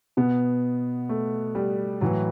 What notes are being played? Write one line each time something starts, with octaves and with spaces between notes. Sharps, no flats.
B2 B3
A3
G3
A2 E3 F#3